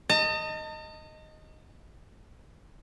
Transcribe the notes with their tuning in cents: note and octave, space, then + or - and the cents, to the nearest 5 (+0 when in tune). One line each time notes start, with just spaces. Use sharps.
D#5 +0 A5 +45